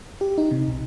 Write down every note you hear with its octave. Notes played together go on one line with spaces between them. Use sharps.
G4
D#4
C3
B1